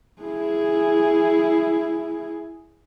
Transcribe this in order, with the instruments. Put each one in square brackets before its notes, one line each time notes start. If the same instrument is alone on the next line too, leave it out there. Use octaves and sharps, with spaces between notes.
[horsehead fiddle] E4 G#4